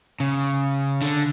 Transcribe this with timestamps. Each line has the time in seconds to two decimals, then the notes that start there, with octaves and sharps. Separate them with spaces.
0.20 C#3
1.02 D3